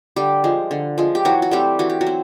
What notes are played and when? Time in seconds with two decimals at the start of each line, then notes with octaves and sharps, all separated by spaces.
0.16 D3 G3 G4
0.44 F3 G#3
0.71 D3
0.98 F3 G#3
1.15 G4
1.25 E3 F#3 F#4
1.42 F#4
1.51 G3 A3 C4 G4
1.79 E3 F#4
1.90 G4
2.01 F#3 F#4
2.07 C4